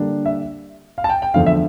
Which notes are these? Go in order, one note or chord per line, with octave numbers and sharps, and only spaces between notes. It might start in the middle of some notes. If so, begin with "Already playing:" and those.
Already playing: D3 G3 A#3 D4
E5
F5
A5
G5
G5
E2 D3 F3 A3 D4 F5
E5